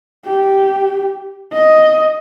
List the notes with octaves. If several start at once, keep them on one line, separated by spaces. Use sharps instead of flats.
G4
D#5